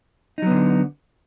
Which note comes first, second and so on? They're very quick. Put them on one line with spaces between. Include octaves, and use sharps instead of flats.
D#4 F#3 B3 D3